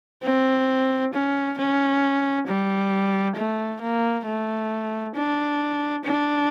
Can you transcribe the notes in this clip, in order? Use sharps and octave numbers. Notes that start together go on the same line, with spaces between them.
C4
C#4
C#4
G3
A3
A#3
A3
D4
D4